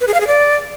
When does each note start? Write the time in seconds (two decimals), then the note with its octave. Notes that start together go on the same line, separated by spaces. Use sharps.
0.01 B4
0.07 G#4
0.14 F5
0.21 G#4
0.27 D5